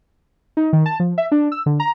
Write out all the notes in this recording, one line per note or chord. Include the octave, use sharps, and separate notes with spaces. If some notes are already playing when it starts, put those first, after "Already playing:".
D#4
D#3
A5
F3
E5
D4
E6
D3
A#5